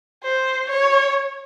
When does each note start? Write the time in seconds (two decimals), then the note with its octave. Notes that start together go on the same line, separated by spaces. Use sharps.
0.24 C5
0.70 C#5